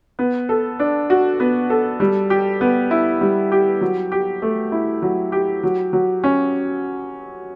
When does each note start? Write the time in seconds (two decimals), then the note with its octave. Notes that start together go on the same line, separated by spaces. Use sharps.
0.19 B3
0.49 A4
0.79 D4
1.10 F#4
1.40 B3
1.70 A4
2.00 G3
2.30 G4
2.61 B3
2.91 E4
3.21 G3
3.52 G4
3.81 F#3
4.12 G4
4.42 A3
4.72 E4
5.02 F#3
5.32 G4
5.63 F#3
5.93 F#3
6.24 C#4